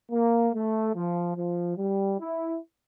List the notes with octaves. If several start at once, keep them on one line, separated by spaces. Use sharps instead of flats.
A#3
A3
F3
F3
G3
E4